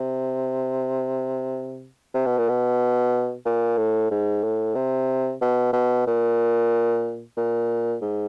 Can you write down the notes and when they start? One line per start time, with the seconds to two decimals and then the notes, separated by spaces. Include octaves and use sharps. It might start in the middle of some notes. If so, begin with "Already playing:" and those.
Already playing: C3
2.14 C3
2.26 B2
2.38 A#2
2.49 B2
3.46 A#2
3.78 A2
4.11 G#2
4.43 A2
4.75 C3
5.42 B2
5.73 B2
6.07 A#2
7.37 A#2
8.02 G#2